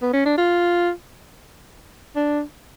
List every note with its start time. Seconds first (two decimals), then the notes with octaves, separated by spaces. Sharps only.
0.02 B3
0.13 C#4
0.26 D4
0.38 F4
2.15 D4